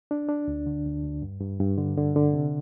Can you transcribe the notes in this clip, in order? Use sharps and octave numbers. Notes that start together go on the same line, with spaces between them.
D4
D4
D2
D3
D2
D2
G2
G2
G2
D3
D3
D3
C3